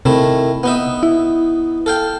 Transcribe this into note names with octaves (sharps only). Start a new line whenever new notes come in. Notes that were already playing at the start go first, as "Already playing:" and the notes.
C3 D#3 A3 E4
B3 D#4 E5
E4
A4 F5 G5